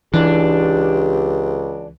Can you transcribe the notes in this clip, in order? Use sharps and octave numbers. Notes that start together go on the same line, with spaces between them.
C#2 E3 D4 G4